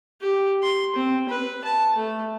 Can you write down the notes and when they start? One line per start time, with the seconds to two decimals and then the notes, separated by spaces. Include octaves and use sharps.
0.21 G4
0.63 C6
0.96 C4
1.29 B4
1.65 A5
1.96 A3